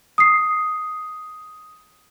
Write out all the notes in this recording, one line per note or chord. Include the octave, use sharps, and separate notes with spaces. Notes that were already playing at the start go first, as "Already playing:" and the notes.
D#6 C7